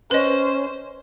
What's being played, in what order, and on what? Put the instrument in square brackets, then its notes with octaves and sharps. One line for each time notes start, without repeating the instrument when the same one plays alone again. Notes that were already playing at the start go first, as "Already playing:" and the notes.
[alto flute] C#4 [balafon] B4 D#5 [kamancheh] C5